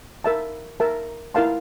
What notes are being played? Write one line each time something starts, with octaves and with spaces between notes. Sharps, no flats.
A#4 E5 A5
A#4 E5 A5
E4 A#4 F5 A5 C6